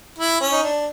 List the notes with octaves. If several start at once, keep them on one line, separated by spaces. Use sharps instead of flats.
E4
C#4
D#4
D4